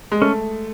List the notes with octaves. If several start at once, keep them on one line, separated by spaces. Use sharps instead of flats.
G#3
A3 C#4